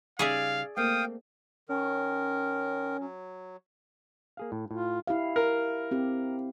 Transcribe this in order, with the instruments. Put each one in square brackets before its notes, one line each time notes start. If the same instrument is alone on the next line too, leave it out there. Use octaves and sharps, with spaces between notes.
[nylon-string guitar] C#3 G3 D#4 [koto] G#4 D5 E5 [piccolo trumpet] F5
[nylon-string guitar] A3 A#3 C4 [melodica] F5 G5 [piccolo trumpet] D#6
[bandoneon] D#3 A#4 [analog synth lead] C#4
[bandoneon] F#3
[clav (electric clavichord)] A#3 G#4 F5
A2
[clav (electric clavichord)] A2 [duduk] F4
[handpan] E4 G4 F5
[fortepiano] A#4
[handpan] C4 G4